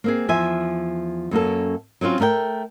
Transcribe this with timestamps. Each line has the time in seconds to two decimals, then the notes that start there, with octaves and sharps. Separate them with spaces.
0.04 A#3 C4 G#4
0.28 E2 F3 E5 G#5
1.31 F#2 A#3 C#4 A4
2.01 F#3 C4 C#4 F4
2.20 A3 A#4 D#5 G5